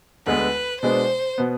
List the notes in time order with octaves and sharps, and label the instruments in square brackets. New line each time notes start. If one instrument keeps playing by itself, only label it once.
[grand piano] D2 D3 G#3 B3 [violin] B4
[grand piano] B2 G#3 B3 D4 [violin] C5
[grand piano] B2 B3